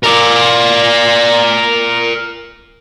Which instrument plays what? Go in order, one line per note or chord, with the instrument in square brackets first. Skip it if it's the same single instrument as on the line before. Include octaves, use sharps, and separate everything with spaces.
[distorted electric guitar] A#4 D5